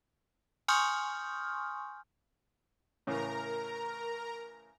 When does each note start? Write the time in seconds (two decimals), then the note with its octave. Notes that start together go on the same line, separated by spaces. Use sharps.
0.68 G#5 C6 C#6 D#6 F6 G6
3.07 A2 C#3 E3 A#4 A#5